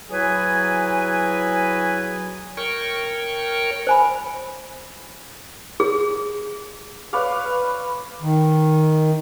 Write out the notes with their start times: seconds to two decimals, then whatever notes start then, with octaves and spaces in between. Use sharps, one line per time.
0.09 F#3 E4 F#4 G#4 B4 G#5
2.57 A#4 C#5 G5 C#6
3.87 C5 G#5 B5
5.80 G#4
7.13 B4 C#5 D5 F5
8.22 D#3